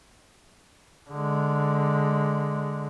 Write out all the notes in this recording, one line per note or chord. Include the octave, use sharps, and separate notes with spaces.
D3 G#3